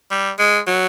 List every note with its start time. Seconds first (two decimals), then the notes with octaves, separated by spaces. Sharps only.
0.11 G3
0.39 G#3
0.67 F#3